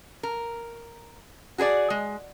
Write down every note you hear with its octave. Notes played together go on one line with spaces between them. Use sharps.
A#4
F#4 G#4 B4 D5
G#3